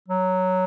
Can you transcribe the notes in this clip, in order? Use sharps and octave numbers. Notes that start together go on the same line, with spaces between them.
F#3